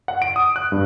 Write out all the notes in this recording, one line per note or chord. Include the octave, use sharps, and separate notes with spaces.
F#5
D7
D#6
F#6
G2